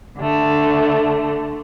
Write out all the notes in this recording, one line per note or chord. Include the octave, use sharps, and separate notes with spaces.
D3 A3